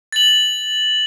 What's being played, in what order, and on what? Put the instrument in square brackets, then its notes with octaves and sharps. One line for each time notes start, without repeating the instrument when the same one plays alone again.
[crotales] A6 F#7